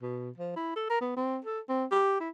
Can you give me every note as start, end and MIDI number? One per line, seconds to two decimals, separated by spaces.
0.02 0.30 47
0.38 0.54 53
0.56 0.72 64
0.76 0.85 69
0.90 1.00 70
1.01 1.13 59
1.16 1.39 60
1.45 1.59 69
1.69 1.84 60
1.91 2.19 67
2.20 2.29 64